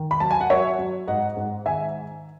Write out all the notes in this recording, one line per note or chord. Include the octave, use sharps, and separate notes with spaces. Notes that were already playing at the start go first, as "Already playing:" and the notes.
Already playing: D#3
B5
F#3 A5
G#5
F#5
F#3 C#5 E5
F#3
G#2 D#5 F#5
G#2
D#3 E5 G#5